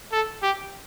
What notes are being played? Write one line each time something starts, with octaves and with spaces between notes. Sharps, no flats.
A4
G4